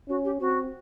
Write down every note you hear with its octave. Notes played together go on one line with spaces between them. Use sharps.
C#4 F#4
G4
C4 F#4